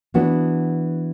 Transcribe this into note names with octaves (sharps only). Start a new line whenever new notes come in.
E3 B3 D4 F#4